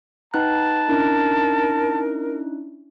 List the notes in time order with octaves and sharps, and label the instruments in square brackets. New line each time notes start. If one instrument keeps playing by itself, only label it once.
[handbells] D#4 F#6 [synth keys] B4 F#5 G5 [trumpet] A5
[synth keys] C#4 D4 E4 [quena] A#4